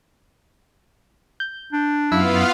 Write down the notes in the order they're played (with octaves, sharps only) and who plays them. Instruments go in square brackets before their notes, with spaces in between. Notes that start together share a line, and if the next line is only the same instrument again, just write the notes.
[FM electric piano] G6
[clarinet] D4
[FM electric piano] F#2 [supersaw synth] B3 F4 F5 [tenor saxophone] E4